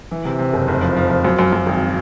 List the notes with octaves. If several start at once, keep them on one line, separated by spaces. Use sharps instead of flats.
E3
C3
C3
F#1
F1
F3
F3
F3
F#2
F#2
F#2
G#1